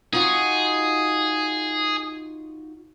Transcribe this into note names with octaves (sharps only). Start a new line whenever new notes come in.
D#4 F4 F#4 G#4